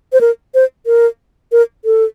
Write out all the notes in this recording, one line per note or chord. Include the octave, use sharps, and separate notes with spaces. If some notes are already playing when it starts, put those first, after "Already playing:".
C5
A#4
C5
A#4
A#4
A4